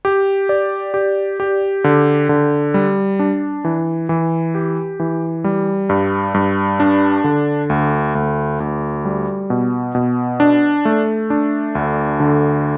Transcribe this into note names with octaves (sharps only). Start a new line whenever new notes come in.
G4
D5
G4
G4
D3
D3
G3
D4
E3
E3
G4
E3
G3
G2
G2
D4
D3
D2
D2
D2
G3
B2
B2
D4
A3
D4
D2
D3